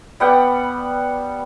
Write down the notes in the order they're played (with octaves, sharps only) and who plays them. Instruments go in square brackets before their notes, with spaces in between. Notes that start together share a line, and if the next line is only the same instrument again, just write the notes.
[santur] G3 B3 F#5 G5